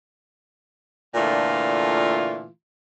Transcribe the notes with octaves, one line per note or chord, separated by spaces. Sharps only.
A#2 D3 E3 A3 F4